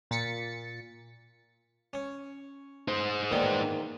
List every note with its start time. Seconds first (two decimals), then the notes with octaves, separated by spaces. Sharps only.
0.11 A#2 A6 B6 C#7
1.93 C#4
2.88 D#4 C5
3.32 E2 A#2 D#3